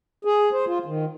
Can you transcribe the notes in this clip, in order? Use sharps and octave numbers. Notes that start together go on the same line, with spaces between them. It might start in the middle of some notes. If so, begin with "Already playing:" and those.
G#4
C5
F4
D#3